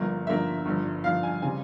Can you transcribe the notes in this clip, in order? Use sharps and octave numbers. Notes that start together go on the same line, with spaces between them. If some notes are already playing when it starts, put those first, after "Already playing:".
Already playing: G1 G2 F3 A#3
G1 G2 F3 A#3 E5
G1 G2 F3
G1 G2 F3 F5
G#5
C#3 G3 C4 G#5